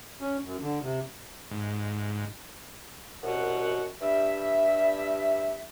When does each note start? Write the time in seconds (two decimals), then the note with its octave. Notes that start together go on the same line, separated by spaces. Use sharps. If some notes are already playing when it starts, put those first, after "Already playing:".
0.21 C#4
0.45 F#2
0.62 D3
0.82 C3
1.51 G#2
3.23 C2 F#2 B2 F#5
4.01 G2 G3 E5